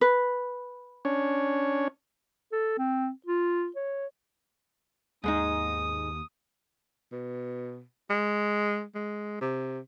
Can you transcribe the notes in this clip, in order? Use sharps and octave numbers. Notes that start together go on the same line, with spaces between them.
B4
C#4 D4 C#5
A4
C4
F4
C#5
D#2 G#2 G#3 D#4 D#6
B2
G#3
G#3
C3